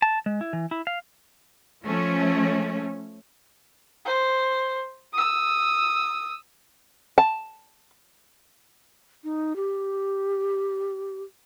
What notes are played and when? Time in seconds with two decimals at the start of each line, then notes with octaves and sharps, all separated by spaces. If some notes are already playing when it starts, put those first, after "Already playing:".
0.02 A5
0.26 G#3
0.41 E4
0.53 E3
0.71 E4
0.87 F5
1.84 F3 A3 C#4
4.05 C5
5.13 D#6 E6
7.18 A5
9.24 D#4
9.56 G4